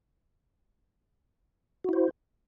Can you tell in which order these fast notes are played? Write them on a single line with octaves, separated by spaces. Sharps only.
F#4 E4 C5